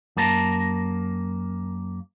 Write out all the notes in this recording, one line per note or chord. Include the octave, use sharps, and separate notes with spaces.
F#2 A#3 A5 A#5